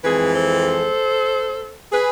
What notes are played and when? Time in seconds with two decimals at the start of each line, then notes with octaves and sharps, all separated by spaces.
0.04 F2 E3 G#3 C4 G#4 B4
0.35 A4 C5
1.92 G#4 B4